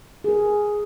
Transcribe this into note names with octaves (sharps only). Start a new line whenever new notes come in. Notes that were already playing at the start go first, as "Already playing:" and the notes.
G#4 A#4